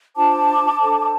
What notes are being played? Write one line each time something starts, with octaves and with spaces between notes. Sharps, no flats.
D4 F4 C5 A5 D6
D4 A4 C5